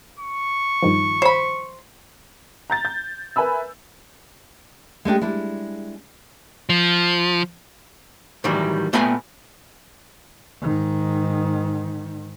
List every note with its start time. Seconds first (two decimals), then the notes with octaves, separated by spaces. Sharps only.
0.20 C#6
0.83 G2 D#3 F3
1.22 C5 B5
2.70 A#5 G6 A6
2.85 G6
3.36 A#4 B4 E5 G#5 B5 E6
5.05 G#3 A3 D4 G4
5.21 G3 G#3 D4 E4
6.69 F3
8.44 A2 D#3 E3 F#3 G3
8.93 A#2 A3 B3 B4 G5 G#5
10.62 G#2 D#3